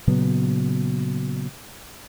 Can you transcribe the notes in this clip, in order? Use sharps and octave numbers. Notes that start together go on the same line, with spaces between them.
A#2 C#3 F#3 B3